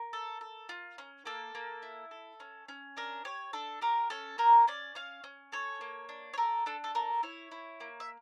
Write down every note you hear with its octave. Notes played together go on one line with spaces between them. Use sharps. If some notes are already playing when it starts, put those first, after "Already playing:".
Already playing: A#4
A4
A4
F4
C#4
A#3 A4
A#3
E4
A4
C#4
C#4
D4 A#4
G4 C#5
D4 A4
G4 A#4
C#4 A4
A#3 A#4
C#4 D5
C#4 F5
C#4
A4 C#5
A#3
D4
C#5
A4 A#4
D4 A4
A4
A4 A#4
E4 C#5
E4
A#3
E5